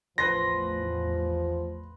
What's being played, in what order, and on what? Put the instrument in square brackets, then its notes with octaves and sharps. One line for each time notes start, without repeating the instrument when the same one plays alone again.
[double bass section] A1 E2 [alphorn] F3 [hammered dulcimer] B4 C6 [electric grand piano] A#6